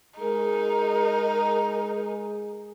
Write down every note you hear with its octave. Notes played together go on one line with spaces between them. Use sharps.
G#3 D#4 G#4 A#4